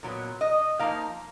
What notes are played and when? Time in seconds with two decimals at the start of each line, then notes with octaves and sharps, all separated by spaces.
0.03 A#2 F#3 B3
0.41 D#5
0.79 F3 A#3 D#4 F5